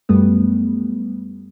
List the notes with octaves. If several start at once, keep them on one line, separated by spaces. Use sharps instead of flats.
F#2 G3 A3 B3